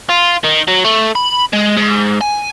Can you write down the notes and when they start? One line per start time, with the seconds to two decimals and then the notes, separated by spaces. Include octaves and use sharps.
0.09 F4
0.44 D#3
0.68 F#3
0.85 A3
1.15 B5
1.53 G#3
1.77 G#2
2.21 G#5